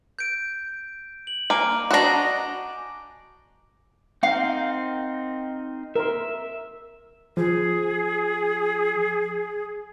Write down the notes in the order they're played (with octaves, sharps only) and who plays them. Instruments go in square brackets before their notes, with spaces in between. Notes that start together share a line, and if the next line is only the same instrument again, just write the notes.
[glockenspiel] G6 D7
F#7
[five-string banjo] A#3 [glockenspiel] G#5 D6 D7
[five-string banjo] D4 F#4 [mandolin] D#5 A#5
[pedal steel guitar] C4 D#4 A#4 [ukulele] F5 F#5
[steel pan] A#4 C6 [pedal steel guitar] E5
[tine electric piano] F3 [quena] G#4